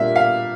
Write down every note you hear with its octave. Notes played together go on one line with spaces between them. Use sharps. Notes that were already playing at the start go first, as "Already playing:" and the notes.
Already playing: A#2 G3 A#3 D4 E5
F5